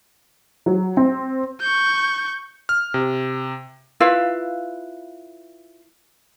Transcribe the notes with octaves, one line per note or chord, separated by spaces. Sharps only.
F#3
C4
C#6 G6
F6
C3
E4 F4 B4 F5